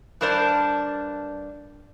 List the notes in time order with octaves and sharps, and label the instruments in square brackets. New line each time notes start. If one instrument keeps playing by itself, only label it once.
[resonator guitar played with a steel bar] G2 D4 A#4 C5 D5